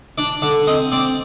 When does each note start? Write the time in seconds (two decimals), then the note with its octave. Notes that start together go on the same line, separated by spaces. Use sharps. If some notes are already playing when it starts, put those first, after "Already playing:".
0.18 D4 D5
0.42 D3 D5
0.67 C4 D#5
0.92 C4 D5